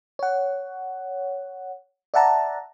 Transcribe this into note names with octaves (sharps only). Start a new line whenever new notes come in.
C#5 F#5
D5 E5 F#5 A5 A#5